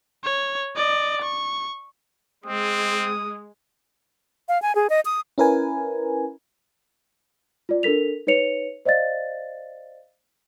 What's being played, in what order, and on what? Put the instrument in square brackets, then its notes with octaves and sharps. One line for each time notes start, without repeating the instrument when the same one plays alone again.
[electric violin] C#5
D5 D#5
C#6
[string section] G#3 [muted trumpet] C4 [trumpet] D#6
[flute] F5
G#5
G#4
D#5
D#6
[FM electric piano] C#4 E4 A#4 B4 G#5
[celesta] F4 D5
D4 A4 A#4 B6 F7
D#4 B4 C#5 C#7 F7
C5 D5 D#5 F5 A6